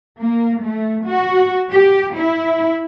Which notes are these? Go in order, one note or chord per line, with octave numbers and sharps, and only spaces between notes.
A#3
A3
F#4
G4
E4